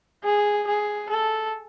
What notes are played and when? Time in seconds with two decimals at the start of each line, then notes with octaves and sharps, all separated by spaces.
0.24 G#4
0.67 G#4
1.09 A4